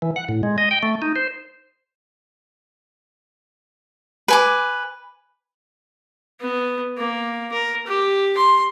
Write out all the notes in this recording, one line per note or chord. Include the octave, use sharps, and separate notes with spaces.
E3
F#5
A2
G#3
D#5
G5
A3
D#4
C5
B4 G#5 D6
B3
A#3
A#4
G4
C6